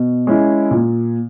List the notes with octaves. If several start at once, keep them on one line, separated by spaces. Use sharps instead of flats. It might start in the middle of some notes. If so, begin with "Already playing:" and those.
Already playing: B2
G#3 C#4 E4
A#2